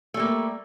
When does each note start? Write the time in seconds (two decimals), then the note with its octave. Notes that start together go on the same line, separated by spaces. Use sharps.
0.14 A3
0.17 G3
0.20 A#3